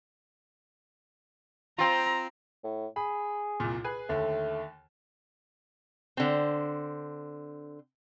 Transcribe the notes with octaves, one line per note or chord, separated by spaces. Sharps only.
C4 F4 A#5
A2
G#4 B5
C2 A#2
G#4 B4 G#5
D#2 D3 A3
D3 C4